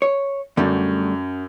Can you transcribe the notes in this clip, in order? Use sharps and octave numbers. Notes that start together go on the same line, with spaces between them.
C#5
F#2 D3 G3 A3